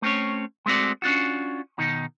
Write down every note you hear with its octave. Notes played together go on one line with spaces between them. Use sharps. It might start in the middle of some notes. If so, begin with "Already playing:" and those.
A3 C4 C#4 C#5
G#3 A3 C4 F#4 D5
C#4 D4 F4 F#4
B2 D#3 D#4